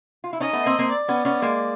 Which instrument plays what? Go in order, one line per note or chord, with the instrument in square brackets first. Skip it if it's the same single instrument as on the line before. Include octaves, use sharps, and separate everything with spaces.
[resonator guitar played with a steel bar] F4
E4
[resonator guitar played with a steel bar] C#4 D#4 [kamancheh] D#5
[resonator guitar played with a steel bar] A3 B3
A#3 C4
A#3 C4
[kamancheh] D5
[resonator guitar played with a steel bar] B3 C#4
B3 C#4
G#3 A#3